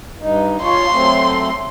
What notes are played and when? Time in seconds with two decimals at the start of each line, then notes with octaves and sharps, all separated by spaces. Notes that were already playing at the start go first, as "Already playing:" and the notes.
0.21 G2 D#4
0.63 F4 C#5 C6
0.93 F#3 A3 C4